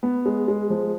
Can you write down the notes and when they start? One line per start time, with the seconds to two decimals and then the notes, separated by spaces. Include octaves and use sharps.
0.03 B3
0.26 G#3
0.48 G#3
0.70 F3